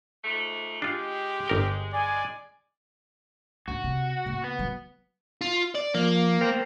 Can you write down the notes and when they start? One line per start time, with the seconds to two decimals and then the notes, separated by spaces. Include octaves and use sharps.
0.24 G#2 F3 A3
0.82 G#3 D4 F4 G4
1.48 G1 A#4 G5
1.93 D5 G#5
3.68 D2 D3 F#4
3.84 C3
4.26 C#3 A#3
4.44 B3
4.59 F#3
5.41 F4
5.75 D5
5.94 F3 A#3
6.41 A#4 C5 G5